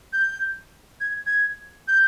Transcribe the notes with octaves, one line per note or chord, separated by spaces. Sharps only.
G6
G#6
G#6
G6